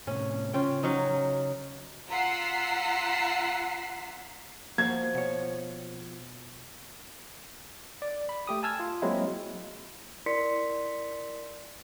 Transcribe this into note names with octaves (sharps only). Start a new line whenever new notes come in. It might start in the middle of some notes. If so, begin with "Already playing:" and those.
A2 C3 C#4
C#3 C#4 F4 G5
F#3 C#4 D#4
F4 F#5 A#5 E6 B6 C7
F3 A#3 F#4 G#6
B2 C#5
D5
B5
A3 G4 D#6
G#5 A5 E6 F6 G#6
F4
F#3 G#3 A#3 C4 E4
E4 A#4 D5 C6 B6 C#7